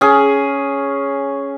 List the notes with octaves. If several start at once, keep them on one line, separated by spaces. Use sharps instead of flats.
C#4 G#4